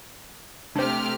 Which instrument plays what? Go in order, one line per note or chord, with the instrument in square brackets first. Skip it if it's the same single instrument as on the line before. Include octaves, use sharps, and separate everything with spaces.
[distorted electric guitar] C3 [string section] A3 G4 F6 [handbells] D4 C5